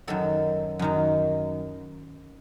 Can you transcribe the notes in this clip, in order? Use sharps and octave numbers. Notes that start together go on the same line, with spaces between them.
F#2 D#3 F#3 A4
F#2 D#3 F#3